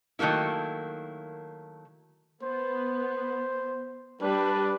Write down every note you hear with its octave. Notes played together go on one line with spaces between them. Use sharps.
D#3 F#3 A3 A#3 E4
B3 C5
G3 D4 B4